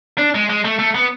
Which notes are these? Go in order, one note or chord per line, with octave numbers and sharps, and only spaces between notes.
D4
G#3
G#3
A3
A3
B3